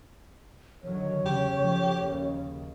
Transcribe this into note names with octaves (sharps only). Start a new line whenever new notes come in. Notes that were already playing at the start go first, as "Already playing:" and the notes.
D3 D#3 F#3 C#5
E2 C#3 G4
C#3 F3 A3
D#2 C#3